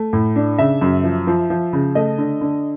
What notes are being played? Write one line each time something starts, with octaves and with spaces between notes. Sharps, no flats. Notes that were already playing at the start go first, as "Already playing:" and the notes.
Already playing: A3
A2
D4
C#3 E5
F#2
F3
F3
F3
C#3
A3 D#5
D3
D3